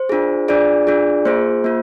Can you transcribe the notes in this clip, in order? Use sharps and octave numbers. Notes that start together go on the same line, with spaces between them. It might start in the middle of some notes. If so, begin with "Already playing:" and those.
Already playing: C5
D4 F4 G#4
D4 F4 G#4 D5
D4 F4 G#4
A#3 F4 G#4 C5
A#3 F4